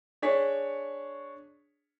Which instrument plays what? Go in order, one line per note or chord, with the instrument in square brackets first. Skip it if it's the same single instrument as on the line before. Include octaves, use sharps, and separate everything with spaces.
[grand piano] D4 G#4 C#5 B6